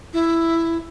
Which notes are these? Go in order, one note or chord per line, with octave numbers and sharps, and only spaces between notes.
E4